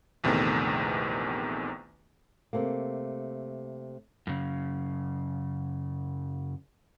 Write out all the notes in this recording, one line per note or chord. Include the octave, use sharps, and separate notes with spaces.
A#1 E2 C3 D#3 A3 B3
C3 A3 A#3
F#2 C#3